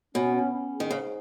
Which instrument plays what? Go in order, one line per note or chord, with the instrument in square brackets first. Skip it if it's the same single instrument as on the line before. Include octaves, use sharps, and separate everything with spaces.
[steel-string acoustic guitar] B2 [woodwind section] C#4
[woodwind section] C#4
C#4
G#4
[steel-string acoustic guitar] D#3
[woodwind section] G#2 [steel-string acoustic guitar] C#3